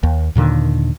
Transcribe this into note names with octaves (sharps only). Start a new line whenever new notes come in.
D#2
D#2 A#2 D3 D#3